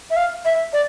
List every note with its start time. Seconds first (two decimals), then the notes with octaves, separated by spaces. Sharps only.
0.10 E5
0.16 F5
0.45 E5
0.73 D5